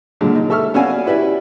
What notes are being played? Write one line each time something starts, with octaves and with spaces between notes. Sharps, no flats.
A#2 D3 F#3 G#3
D#4
A4 E5 C#6 E6 F6
B3 C#4 F#4 D5 F5 G#5
E4 G4 B4 D5 E5